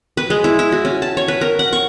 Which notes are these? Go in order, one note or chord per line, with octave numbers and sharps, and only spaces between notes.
B4
G#3
E4
E4
F#4
C#4
A5
C#5
B4
A#4
F#5
C#6